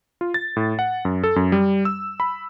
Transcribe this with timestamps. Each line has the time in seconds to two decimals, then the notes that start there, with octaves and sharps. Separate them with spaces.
0.21 F4
0.34 A6
0.57 A2
0.79 F#5
1.05 F#2
1.24 A4
1.36 F#2
1.52 G3
1.85 E6
2.20 B5